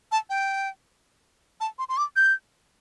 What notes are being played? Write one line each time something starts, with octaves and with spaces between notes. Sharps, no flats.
A5
G5
A5
C6
C6
D6
G6